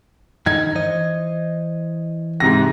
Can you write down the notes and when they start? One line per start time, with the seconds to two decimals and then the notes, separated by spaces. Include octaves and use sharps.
0.46 G2 D#3 D#4 G#6
0.75 E3 C5 D#5
2.40 G#2 C3 A#6